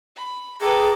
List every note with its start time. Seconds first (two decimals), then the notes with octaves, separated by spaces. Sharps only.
0.16 B5
0.61 G#4 A4 B4 G5 A#5 D6